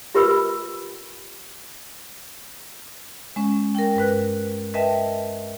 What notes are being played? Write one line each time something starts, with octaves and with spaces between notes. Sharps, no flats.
F4 G4 A#4 B4 B5 E6
G#3 C#4
A#4 G5
G2 A#4 B4 F#6
A#4 B4 D#5 E5 G5 A5